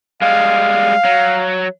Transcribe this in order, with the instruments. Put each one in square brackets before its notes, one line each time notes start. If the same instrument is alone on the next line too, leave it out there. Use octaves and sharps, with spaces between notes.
[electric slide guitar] G3 G#3 [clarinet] F5
[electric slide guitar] F#3